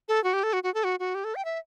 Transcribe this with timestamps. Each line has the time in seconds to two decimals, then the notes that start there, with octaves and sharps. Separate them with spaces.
0.08 A4
0.24 F#4
0.33 G4
0.43 A4
0.53 F#4
0.63 F#4
0.74 A4
0.84 F#4
1.00 F#4
1.15 G4
1.24 A4
1.35 G5
1.45 E5